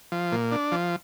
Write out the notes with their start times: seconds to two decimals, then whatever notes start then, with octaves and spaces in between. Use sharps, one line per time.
0.12 F3
0.32 A#2
0.52 D4
0.72 F3